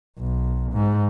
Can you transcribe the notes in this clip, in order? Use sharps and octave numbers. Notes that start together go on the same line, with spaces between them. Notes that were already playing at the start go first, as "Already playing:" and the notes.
B1
G#2